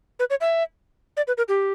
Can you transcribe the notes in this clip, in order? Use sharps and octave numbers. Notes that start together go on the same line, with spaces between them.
B4
C#5
E5
D5
B4
A#4
G4